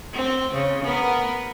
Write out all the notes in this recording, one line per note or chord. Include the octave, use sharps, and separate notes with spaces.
C4
C#3
B3 A#4 B4